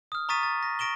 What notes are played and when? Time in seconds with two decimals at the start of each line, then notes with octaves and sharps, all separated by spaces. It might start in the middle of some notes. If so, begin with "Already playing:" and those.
0.12 D#6 F6
0.29 A#5 C#6 D#6 A6 B6 D#7
0.43 A6
0.63 A#6
0.79 C#6 A#6 D7 E7 G7